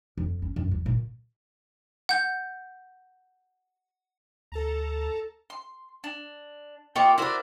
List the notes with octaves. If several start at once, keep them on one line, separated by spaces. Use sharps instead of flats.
F2
C#4
F#2
E2
A#2
F#5 G6
D2 A4 A5 A#5
C6
D4
A#3 F4 G4 D#5 G5 C#6
D4 E4 F#4 A#4 C5